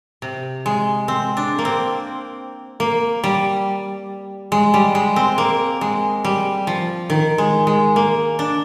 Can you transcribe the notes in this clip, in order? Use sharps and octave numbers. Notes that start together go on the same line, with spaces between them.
C3
G#3
C4
D4
A#3
C4
A#3
G3
G#3
G3
G#3
C4
A#3
G#3
G3
F3
D#3
G#3
G#3
A#3
D4